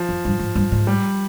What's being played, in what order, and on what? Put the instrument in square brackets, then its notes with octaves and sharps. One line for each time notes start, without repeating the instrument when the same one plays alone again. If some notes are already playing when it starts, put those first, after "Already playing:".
Already playing: [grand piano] F3
[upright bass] F2
G2
G#2
G2
G#2
[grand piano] G3